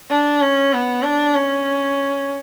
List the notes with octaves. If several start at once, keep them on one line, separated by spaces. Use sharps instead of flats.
D4
C#4
B3
D4
C#4